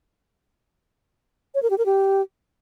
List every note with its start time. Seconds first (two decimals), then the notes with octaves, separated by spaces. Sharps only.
1.55 C#5
1.62 A#4
1.70 G4
1.78 A#4
1.86 G4